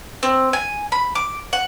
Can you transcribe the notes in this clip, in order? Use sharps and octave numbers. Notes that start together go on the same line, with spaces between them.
C4
G#5
B5
D6
F#5